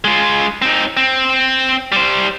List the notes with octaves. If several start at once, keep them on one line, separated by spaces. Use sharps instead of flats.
G#3 F4
C4 D#4
C4
G3 C5